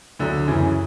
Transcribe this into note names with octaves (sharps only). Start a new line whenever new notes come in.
D2 D3 F#3
F#2 C#3 E3